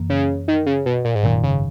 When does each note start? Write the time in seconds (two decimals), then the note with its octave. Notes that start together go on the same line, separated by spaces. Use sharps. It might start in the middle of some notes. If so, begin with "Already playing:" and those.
Already playing: F#2 E3 A#3
0.10 C#3
0.48 D#3
0.66 C#3
0.86 B2
1.05 A#2
1.15 G#2
1.23 G#1 F#2 A#2 D#3
1.43 C#3